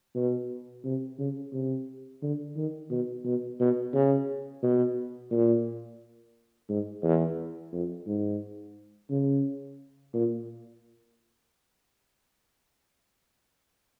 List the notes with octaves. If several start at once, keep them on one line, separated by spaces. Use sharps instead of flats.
B2
C3
C#3
C3
D3
D#3
B2
B2
B2
C#3
B2
A#2
G#2
E2
F2
G#2
C#3
A#2